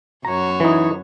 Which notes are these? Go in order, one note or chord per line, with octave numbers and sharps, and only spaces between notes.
F#2 F#4 C#5 A#5
E3 D#4